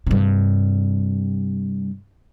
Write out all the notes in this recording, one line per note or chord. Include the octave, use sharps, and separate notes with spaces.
G2 C3